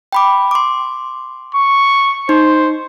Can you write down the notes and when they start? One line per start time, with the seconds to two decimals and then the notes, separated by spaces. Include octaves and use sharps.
0.12 G5 B5 D6
0.51 C6 D6
1.54 C#6
2.29 D#4 C5